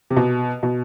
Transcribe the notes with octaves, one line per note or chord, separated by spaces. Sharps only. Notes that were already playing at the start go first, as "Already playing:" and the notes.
C3
B2
B2